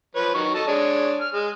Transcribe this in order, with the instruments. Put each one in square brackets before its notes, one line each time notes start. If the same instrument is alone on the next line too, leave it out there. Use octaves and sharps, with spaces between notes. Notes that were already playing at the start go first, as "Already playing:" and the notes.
[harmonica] F3 B4 C#5
D#3 F#3 C#6
A4 D#5 A5
G#3 D4 C#5
F6
G#3